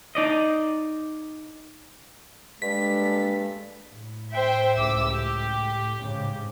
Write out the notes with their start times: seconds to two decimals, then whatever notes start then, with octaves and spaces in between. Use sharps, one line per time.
0.15 D#4 D5 D#5
2.62 G2 G#3 A#3 D4 A4 B6
3.89 A2
4.33 C5 E5 G5
4.76 C#2 D6 E6
5.07 G4
5.99 G#2 C#3